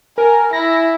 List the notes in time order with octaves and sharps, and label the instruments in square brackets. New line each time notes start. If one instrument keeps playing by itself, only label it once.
[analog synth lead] A#4 [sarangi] G#5
[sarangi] E4 [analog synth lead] A#6